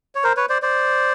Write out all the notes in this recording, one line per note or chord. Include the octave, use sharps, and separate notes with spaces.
C#5
A#4 C5
B4 C#5
C5 D5
C5 D5